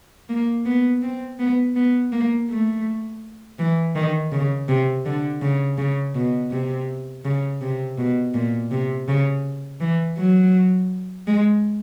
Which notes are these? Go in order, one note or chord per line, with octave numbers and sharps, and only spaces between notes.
A#3
B3
C4
B3
B3
A#3
A3
E3
D#3
C#3
C3
D3
C#3
C#3
B2
C3
C#3
C3
B2
A#2
C3
C#3
E3
F#3
G#3